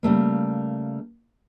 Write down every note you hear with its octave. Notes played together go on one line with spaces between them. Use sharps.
C#3 G3 A3 A#3